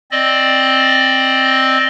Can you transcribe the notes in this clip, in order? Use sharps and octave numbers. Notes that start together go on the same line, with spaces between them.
C4 D5 D#5